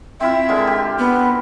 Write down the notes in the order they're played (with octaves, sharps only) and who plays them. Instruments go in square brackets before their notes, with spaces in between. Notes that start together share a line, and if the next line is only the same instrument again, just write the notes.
[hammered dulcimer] C4 E4 F4 [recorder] E5
[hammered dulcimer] D3 G#3 A#4
G4
[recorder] B3